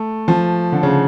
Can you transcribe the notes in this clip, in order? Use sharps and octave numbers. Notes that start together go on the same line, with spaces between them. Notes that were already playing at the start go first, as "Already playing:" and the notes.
Already playing: A3
F3
D3
C#3